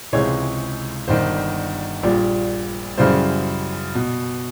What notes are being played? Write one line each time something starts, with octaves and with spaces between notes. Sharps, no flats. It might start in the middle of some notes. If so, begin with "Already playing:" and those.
C#2 C3 E3 G#3 C#5
G1 G2 D#3 C5
A#1 A#2 G3
F#2 C#3 E3 G3 C5
B2